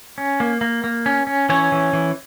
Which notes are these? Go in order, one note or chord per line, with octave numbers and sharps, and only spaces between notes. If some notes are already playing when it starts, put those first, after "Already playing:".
C#4
A#3
A#3
A#3
C#4
C#4
E3 C#4 C#5
E3
E3